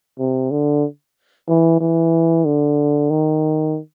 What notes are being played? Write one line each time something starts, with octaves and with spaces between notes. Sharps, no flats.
C3
D3
E3
E3
D3
D#3